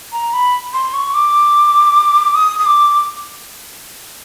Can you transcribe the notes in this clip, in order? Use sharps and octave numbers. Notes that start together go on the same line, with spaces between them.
A#5
B5
C6
C#6
D6
D#6
D#6
D6